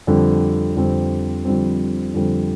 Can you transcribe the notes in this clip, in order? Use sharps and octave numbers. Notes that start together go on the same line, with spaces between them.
F2 D3 G3 C4
F2 D3 G3 C4
F2 D3 G3 C4
F2 D3 G3 C4